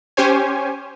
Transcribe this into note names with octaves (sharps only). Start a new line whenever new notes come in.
C#4 G4 C5 C#5 G#5